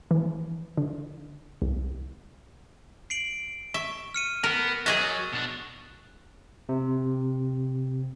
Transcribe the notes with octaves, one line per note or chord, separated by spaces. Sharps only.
E3
D3
C2
C7 D7 F#7
E5 C#6
F6 C#7 D#7
B3 A#4
F#3 G#4 D#5 E5 C#6 F#6 A6
B2 D4
C3